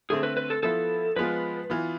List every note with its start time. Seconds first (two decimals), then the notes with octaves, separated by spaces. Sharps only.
0.10 D3 A3 C4 G#4
0.23 B4
0.37 B4
0.50 A4
0.63 F3 B3 E4 A4 B4
1.16 F3 G#3 B3 F4 B4
1.70 E3 B3 F4